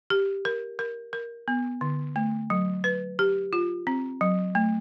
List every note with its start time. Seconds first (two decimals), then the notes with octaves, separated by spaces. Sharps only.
0.10 G4
0.45 A#4
0.79 A#4
1.13 A#4
1.48 B3
1.81 D3
2.16 A3
2.50 F#3
2.84 B4
3.19 G4
3.53 F4
3.87 C4
4.21 F#3
4.55 A3